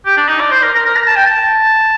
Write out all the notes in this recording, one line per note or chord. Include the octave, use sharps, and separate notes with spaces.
G4
D4
D#4
D5
C5
A#4
A#4
A#4
A#5
A5
G5
A5